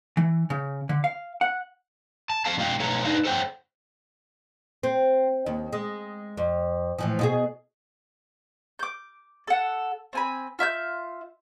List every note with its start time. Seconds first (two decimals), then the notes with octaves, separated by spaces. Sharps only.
0.17 E3
0.50 C#3
0.89 D3
1.04 F5
1.41 F#5
2.30 A5
2.45 A4 F5 A5
2.57 B2 G#3 F4 D#5 F5 G5
2.80 B2 A3 A4 B4 C#5 A#5
3.05 D4 D#4 B4 D#5 F5
3.25 A4 C5 C#5 F#5 G5
4.83 C4
5.46 D#2
5.73 G#3
6.37 F2
6.99 A2 E3 F3
7.19 B2 F4 G#4
8.79 D6 G6
9.47 A4 F#5
10.13 C4 G#5 B5
10.59 F4 E5 F6 G6